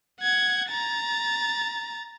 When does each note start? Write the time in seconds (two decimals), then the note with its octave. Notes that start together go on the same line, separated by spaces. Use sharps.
0.21 F#5 G#6
0.70 A#5 A6